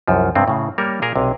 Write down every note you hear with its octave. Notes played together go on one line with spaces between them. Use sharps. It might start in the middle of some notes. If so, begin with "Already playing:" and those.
C2 F#2 F3
G2 C3 G#3 C4
A2 C#3
G3 A#3 A#4 C#5
A#2 G#4 A#4
B1 C3